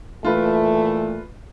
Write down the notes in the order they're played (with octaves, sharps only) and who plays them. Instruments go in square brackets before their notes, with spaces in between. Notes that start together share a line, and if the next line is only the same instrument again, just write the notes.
[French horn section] A#2 E3 A3 [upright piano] F4 B4